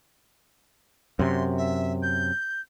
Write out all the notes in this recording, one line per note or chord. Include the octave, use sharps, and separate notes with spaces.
F#2 C3 C6
E5
G6